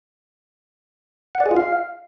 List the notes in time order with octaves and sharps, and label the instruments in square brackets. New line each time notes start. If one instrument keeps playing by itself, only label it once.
[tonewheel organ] F#5
D5
G#4
F4
F5